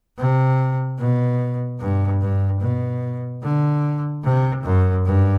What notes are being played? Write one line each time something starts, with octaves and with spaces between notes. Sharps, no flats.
C3
B2
G2
G2
B2
D3
C3
F#2
G2